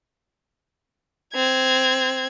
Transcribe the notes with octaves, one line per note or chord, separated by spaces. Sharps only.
C4 G#6